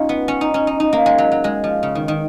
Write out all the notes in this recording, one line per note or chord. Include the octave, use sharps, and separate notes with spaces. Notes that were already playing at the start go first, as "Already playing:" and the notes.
Already playing: C#4 D#4 F4
B3
C#4
D#4
C#4
D#4
D#4
A#3
G#3
F#3
F#3
G#3
F3
C#3
D#3
D#3